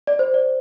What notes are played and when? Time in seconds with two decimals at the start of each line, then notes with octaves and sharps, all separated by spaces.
0.07 D5
0.19 C5
0.34 D5